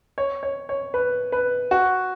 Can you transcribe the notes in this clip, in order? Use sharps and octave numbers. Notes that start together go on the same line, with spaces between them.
C#5
C#5
C#5
B4
B4
F#4